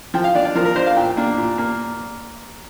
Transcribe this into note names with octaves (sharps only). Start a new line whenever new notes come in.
F3 G5
F5
D4 D5
D5
F3 A#4
A#4
D4 C5
F5
A#2 G5
A#3 D4
A#2
A#3